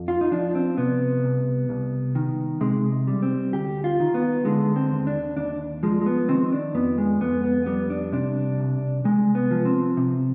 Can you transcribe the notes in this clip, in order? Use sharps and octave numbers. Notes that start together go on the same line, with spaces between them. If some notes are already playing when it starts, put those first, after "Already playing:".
Already playing: F2
F4
D#4
F3 D4
C4
C3 B3
C2
C2
D#3
C3 G#3
G3
C4
D2 G4
F4
D#3
B3
D3 G#3
C4
D#2
D4
D#2 D4
F3 G#3
G#3
B3
D#3 C4
D4
F2 B3
G#3
F2 B3
B3
G3 B3
D4
C3 D4
C2
C2 G#3
B3
F3
C4
C3